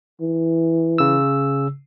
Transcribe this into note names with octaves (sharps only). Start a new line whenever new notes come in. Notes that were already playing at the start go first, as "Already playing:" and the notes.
E3
C#3 E6